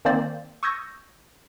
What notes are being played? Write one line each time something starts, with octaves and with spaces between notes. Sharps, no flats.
D#3 A#3 C4 C5 D5
C#6 D#6 E6 G6 G#6 A#6